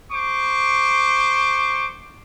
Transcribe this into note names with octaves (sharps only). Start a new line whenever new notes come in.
C5 C#6 D6